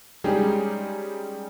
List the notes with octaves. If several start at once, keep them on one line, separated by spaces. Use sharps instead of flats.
G3 G#3 C#4 D#4 G4 G#4